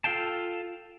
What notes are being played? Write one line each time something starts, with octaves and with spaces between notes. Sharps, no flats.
F4 A4 F5 G5 A5